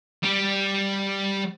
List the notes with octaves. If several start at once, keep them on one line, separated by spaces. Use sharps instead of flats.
G3 G4